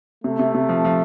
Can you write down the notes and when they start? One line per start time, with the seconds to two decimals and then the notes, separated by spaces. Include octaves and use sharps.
0.24 C3 A3
0.39 C3
0.55 C3
0.69 F3
0.85 F3